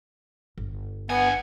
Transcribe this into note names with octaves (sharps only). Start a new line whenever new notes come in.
G1
G2 B3 F#5 G#5